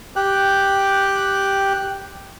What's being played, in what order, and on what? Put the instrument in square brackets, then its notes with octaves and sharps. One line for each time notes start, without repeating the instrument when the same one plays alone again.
[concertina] G4 G5 F#6